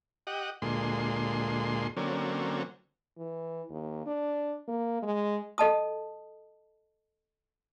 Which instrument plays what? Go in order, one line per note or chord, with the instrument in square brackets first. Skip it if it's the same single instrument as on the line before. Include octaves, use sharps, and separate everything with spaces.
[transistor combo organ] G4 D#5 F#5
D2 A#2 G#3 C6
D3 F#3 A#3 C4 C#4
[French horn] E3
D#2
D4
A#3
G#3
[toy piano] A4 D#5 A5 D#6